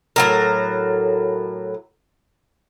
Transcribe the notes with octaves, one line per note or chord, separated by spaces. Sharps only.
A2 F#3 A#4